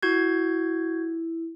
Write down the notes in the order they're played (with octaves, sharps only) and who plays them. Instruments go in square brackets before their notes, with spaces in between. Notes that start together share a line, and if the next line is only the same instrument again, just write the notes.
[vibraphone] E4 [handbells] F#4 G6 G#6